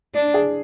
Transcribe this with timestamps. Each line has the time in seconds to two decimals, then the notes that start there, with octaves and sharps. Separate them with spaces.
0.14 D4
0.34 G#4